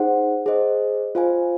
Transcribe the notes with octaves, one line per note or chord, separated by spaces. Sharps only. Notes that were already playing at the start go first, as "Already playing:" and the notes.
Already playing: D#4 G#4 C5 F#5
G#4 C5 D#5
F4 C5 F5 G#5